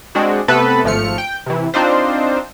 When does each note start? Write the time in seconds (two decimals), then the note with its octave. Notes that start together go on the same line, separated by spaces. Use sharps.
0.15 G#3 C4 D4 F#4
0.48 C3 A3 B3 A4 B4
0.84 G#1 F3 A3 F6 C#7
1.18 G5
1.46 C3 E3
1.74 C4 D4 D#4 F4 C5